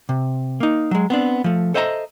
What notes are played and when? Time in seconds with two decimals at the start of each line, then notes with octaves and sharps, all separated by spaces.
0.09 C3
0.60 A#3 D#4
0.91 F#3 G#3
1.10 B3 C4 D4
1.44 F3 A3
1.74 A4 C5 D#5 E5 A5 A#5